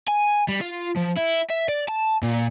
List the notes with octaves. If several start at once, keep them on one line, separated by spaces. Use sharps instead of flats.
G#5
G3
F4
F3
E4
E5
D5
A5
A#2